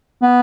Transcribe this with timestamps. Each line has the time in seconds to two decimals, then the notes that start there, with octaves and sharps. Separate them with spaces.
0.22 B3